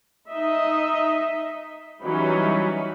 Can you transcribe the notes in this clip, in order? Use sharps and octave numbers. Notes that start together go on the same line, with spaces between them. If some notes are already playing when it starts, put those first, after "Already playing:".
D#4 D#5 E5
E3 F#3 G3 C#4 D#4 B5